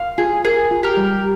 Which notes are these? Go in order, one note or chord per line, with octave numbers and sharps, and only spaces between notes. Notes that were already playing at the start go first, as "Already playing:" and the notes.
Already playing: F5
F4 G#4
G#4 A#4
F4
G4 A#4
G3